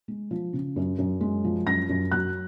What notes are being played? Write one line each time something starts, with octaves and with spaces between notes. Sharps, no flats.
G#3
F3
C#3
F#2
F#2
G#3
F3
F#2 A#6
F#2
F#3 F#6